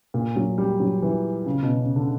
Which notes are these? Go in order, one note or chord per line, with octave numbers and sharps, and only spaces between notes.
A#2
F#3
G3
F#3
E3
C#3
B2
C#3
D3